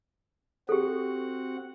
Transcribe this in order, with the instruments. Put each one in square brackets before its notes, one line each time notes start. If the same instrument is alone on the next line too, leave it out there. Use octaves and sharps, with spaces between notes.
[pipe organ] C4 F#4 F#5 [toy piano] G4 A4